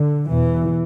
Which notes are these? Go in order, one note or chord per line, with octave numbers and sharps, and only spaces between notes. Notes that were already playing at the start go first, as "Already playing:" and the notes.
Already playing: D3
E2 B2 E3